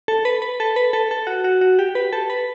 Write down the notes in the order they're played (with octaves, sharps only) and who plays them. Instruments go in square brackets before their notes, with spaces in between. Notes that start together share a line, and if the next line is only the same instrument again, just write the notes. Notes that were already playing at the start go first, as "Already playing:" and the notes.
[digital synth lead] A4
B4
B4
A4
B4
A4
A4
F#4
F#4
F#4
G4
B4
A4
B4